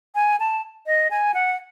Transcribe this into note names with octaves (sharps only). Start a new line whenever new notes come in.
G#5
A5
D#5
G#5
F#5